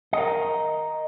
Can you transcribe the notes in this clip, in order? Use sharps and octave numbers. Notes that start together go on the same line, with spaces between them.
A#4 D#5